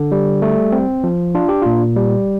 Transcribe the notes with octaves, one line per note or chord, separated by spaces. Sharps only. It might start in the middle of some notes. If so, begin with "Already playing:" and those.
Already playing: D3
G3
A3
C4
F3
D4 F4
G4
A#2 F4
G3